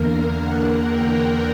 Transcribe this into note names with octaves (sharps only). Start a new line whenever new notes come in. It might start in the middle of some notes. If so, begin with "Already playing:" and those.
Already playing: E2 D3 A#3 A#4
F#5
G5